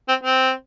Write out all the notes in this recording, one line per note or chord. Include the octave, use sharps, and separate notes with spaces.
C4
C4